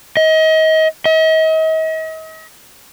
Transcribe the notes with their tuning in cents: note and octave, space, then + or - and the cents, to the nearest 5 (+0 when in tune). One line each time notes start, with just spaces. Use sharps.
D#5 +30
D#5 +40